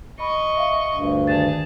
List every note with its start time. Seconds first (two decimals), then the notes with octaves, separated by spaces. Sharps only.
0.20 D#5 B5 C#6
0.57 E5 F5
0.94 D2 G2
1.27 D#3 G#4 D5 A5 A6